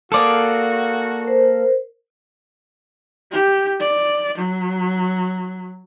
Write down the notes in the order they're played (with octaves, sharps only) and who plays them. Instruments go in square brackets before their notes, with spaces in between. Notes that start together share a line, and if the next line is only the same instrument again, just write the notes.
[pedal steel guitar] A#3 A4 [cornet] F#4 [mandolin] G#4 D5 F5
[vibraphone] A#4 C5
[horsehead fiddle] G4
D5
F#3